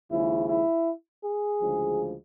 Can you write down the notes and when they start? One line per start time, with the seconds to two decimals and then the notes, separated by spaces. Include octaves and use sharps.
0.11 D#2 C#3 F3 G#3 E4
0.49 E4
1.24 G#4
1.62 D2 C#3 F3 G#3